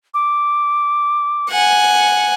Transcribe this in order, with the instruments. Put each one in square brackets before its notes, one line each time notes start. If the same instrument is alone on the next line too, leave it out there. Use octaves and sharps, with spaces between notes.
[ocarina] D6
[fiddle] F#5 G#5